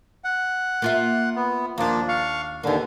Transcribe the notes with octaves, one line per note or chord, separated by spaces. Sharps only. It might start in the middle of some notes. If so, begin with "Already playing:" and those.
F#5
A#3 F4 E5
B3
D#2 F3 A#3 D4
F5 C#6
D#2 D3 A#3 B3